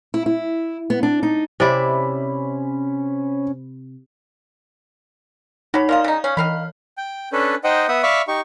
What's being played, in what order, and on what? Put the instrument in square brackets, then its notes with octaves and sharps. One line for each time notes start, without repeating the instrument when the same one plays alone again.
[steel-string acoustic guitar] E4
E4
B3
D4
D#4
[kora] C3 E4 D5 [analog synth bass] C#4 [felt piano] C5 B5
[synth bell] D#4 C#5 [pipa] F#4 B5
[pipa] A#3 F4 D#5 [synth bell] D5 F5
[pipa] C#3 D#4
[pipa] C#4 [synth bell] C#5
[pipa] D#3 F5 B5 [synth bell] E3
[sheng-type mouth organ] G5
C#4 D4 A4 B4
D#4 C5 D#5 F#5 G5
B3 E5 F#5 D#6
D5 E5 F5 B5 C#6
D#4 G4 C#6